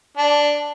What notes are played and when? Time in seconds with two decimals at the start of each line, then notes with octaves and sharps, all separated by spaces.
0.17 D4